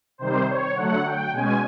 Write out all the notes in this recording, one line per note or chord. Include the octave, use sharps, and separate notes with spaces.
C3 D#3 G3 C5
C#5
D3 F#3 A3 F#5
G5
B2 G#3 C#4 G#5